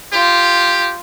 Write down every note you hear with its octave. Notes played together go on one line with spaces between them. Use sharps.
F4 G4